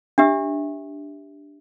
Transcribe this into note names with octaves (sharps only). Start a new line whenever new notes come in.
D4 G4 E5